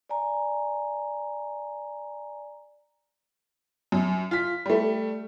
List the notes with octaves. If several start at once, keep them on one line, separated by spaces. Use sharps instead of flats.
D5 G#5 A#5
F#2
F4 B6
G3 A3